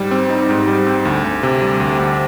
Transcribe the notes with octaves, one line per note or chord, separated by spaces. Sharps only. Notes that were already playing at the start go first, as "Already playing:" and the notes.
Already playing: G#2 G3
C4
D#4
G#2
G3
C4
D2
D2
C3
G3
D2
D2